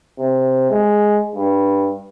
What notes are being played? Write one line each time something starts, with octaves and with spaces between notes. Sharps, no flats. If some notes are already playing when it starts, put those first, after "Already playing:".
C3
G#3
G2